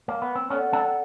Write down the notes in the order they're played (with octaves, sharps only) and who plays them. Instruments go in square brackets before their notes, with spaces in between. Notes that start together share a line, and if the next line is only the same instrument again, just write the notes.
[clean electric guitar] A#3
B3
C4
[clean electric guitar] B3 C#4 [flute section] A4 D5 F#5
[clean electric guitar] C4 D4